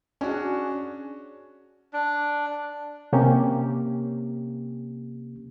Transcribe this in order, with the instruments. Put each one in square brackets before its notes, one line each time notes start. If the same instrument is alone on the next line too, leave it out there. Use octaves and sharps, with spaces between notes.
[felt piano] C#4 D4 F#4 G#4
[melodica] D4
[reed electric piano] C3 A#3 C#4 G4